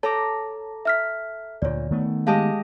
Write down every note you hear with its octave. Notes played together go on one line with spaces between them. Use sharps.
A4 C#5 A5 A#5 D6
E5 F6 B6
D2 A#2 C#5 D5
D#3 A3 B3
G#3 G4 D#5 F5 A5